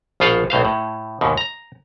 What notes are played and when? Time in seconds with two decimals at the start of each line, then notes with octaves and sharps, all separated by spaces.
0.20 A#1 B2 F4 C5 F5 F#5
0.50 B1 A2 C5 F5
0.65 A2
1.21 D#2 G#2 B2
1.37 A#5